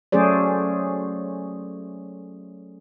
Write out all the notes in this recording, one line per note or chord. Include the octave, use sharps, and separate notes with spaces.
F#3 A3 C#4 G#4 C5 D5